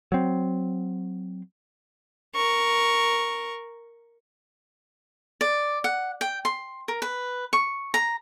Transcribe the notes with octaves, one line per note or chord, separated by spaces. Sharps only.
F#3 C4
A#4 C#6
D5
F#5
G5
C6
A#4
B4
C#6
A#5